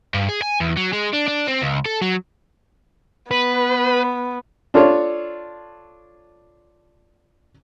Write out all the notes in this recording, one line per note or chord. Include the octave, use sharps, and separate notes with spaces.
G2
G#4
G#5
E2
F#3
G#3
D4
D4
C4
C#2
A4
F#3
B3 B4
D4 F4 A4 C#5